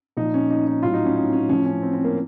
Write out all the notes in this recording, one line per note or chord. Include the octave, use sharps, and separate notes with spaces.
A#2 F3 D#4
C#4
D#4
D#4
A2 F#3 F4
D#4
C#4
D#4
C#4
A2 F3 C#4
C#4
C4
C4
A#3